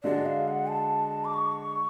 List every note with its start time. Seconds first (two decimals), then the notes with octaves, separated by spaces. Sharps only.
0.04 D3 G#3 D4 F#4 D5
0.26 F5
0.48 F#5
0.69 A5
1.25 D6
1.34 C#6